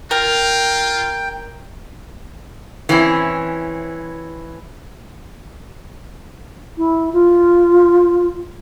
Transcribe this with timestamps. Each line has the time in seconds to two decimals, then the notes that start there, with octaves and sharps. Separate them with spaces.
0.11 F4 A#4 G5
2.89 E3 C4 C#4 E4
6.77 E4
7.13 F4